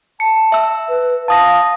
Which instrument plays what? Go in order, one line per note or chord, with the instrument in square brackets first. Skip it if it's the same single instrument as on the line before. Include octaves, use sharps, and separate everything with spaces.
[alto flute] A5 [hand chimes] C#7
[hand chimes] E5 E6
[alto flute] B4
[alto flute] F5 [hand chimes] A5 D#6 A#6